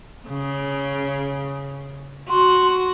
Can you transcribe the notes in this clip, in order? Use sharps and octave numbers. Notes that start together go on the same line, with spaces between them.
C#3
F#4 C6